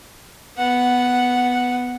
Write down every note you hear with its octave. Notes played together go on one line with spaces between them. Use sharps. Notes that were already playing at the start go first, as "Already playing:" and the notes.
B3 F#5